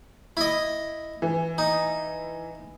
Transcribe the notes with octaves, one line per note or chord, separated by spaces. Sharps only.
E4 D#5
E3
D#4